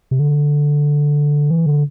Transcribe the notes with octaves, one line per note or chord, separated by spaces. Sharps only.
C3
D3
E3
D3